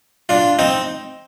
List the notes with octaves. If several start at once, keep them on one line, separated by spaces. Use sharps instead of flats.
D4 F4
C4 D#4